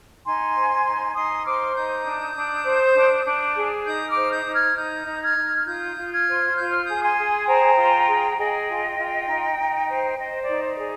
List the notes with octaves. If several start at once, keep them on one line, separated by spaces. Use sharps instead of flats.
D#4 G#5 C6
C5
D#4
D#4 C6 D#6
C5 D6 F6
D#4 D#6 G6
D4
D4
C5
D4
D4
G#4
D#4 D#6 G6
D6 F6
C5
D#6 G6
D#4
F6 G#6
D#4 D#6 G6
D#4
F6 G#6
D#4
F4 D#6 G6
F4
F6 G#6
C5
F4 G6
F6
G#4 D#6 G6
G#5 C6
G#4
C5 G5 A#5
F4
G#4
G#4 D#5 G5
F4
F4
D#4
D#4
C5
C5 D#5
D5
D#4
D5
G#4